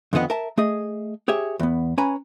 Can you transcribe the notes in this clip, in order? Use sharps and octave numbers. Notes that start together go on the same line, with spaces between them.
F2 D3 D#3 B3 D#5 F#5
A#4 E5 A5
A3 G#4 D#5
G4 G#4 C#5 E5
E2 B3
C#4 B4 G#5 A#5 B5